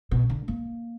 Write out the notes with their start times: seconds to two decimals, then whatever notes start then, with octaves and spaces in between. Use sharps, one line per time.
0.11 B2
0.29 D3
0.48 A#3